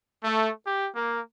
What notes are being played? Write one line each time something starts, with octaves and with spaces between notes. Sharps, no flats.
A3
G4
A#3